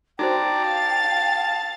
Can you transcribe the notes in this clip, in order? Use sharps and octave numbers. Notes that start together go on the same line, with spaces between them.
D#4 F#4 C5 D5 G5 A5 A#5
F5 A5 A6